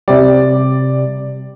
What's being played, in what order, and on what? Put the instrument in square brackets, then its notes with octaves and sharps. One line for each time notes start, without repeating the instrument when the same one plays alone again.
[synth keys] C3 G3 [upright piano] D5